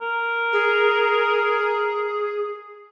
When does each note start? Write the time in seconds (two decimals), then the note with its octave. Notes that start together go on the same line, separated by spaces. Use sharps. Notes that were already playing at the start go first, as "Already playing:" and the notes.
0.01 A#4
0.53 G#4